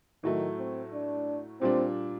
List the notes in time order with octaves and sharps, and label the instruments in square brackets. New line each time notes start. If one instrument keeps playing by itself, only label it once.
[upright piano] A2 F#3 A3 [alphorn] D#3
[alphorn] C4
D4
[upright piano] A#2 G3 D4 [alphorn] C4